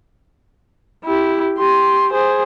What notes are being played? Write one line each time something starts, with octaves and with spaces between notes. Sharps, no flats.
E4 G4
G4 C6
G#4 C5